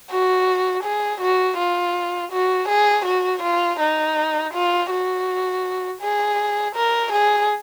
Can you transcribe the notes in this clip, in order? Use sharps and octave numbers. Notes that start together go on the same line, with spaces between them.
F#4
G#4
F#4
F4
F#4
G#4
F#4
F4
D#4
F4
F#4
G#4
A#4
G#4